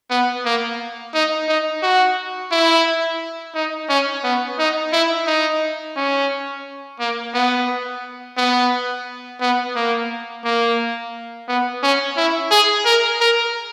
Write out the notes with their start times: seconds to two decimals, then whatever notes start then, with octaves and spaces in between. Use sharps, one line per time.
0.10 B3
0.45 A#3
1.14 D#4
1.49 D#4
1.83 F#4
2.52 E4
3.55 D#4
3.90 C#4
4.24 B3
4.59 D#4
4.93 E4
5.27 D#4
5.97 C#4
7.00 A#3
7.34 B3
8.37 B3
9.41 B3
9.76 A#3
10.44 A#3
11.48 B3
11.83 C#4
12.17 E4
12.51 G#4
12.85 A#4
13.21 A#4